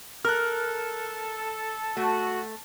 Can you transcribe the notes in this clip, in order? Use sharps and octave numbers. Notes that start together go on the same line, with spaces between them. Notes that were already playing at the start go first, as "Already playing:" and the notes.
A4 A#4 F6 F#6
A3 F#4